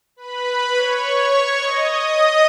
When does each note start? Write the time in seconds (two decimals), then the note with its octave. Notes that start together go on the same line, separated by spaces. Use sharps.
0.16 B4 B5
0.73 C#5 C#6
1.58 D#5 D#6